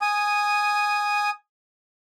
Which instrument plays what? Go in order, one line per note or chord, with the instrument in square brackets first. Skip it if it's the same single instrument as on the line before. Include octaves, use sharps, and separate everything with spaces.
[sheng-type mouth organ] G#5 D#6